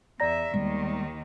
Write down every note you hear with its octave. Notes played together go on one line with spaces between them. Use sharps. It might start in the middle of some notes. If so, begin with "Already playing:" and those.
E2 D5 E5 A#5 A#6
D#2 D#3 G3 G#3 B3